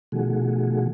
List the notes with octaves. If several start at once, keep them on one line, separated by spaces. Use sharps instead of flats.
B2 D#3 F3 A3 F#4 G#4